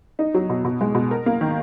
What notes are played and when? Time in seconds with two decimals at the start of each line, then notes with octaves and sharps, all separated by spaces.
0.19 D#4
0.34 F#3
0.50 B2
0.65 B2
0.81 G#3
0.95 B2
1.11 A#4
1.26 A#3
1.41 D#3